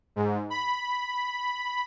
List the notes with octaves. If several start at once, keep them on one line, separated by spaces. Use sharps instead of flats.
G#2
B5